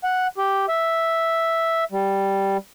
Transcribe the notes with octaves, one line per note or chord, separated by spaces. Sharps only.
F#5
G4
E5
G3